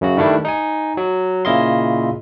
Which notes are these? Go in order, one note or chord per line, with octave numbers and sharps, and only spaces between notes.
F#2 C#3 F#4
D#3 G3 A3 D4 E4
D#4 G#5
F#3
A#2 C#3 E4 D#5 F5 C6